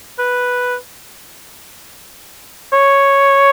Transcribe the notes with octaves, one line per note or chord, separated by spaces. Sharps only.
B4
C#5